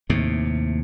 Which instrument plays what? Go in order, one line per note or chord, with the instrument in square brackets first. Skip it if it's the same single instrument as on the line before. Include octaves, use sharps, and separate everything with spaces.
[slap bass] D#2 A2 C3